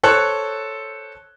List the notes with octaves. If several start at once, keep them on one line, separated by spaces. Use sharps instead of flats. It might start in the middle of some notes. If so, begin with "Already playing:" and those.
A4 C5 C#5 C#6 F#6